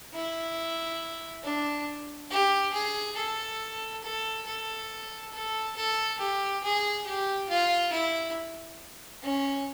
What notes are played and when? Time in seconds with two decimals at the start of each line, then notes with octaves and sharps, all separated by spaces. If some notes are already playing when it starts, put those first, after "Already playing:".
0.14 E4
1.44 D4
2.31 G4
2.73 G#4
3.17 A4
4.04 A4
4.46 A4
5.33 A4
5.76 A4
6.19 G4
6.63 G#4
7.07 G4
7.49 F4
7.92 E4
9.23 C#4